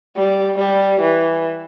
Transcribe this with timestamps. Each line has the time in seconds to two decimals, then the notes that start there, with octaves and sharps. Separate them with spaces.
0.17 G3
0.59 G3
1.01 E3